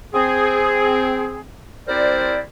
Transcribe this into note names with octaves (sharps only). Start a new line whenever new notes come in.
C4 G#4
G3 C4 E4 A#4 C5 D5